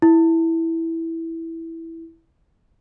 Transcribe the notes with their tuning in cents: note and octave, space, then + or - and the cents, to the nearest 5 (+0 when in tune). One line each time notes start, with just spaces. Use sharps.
E4 -5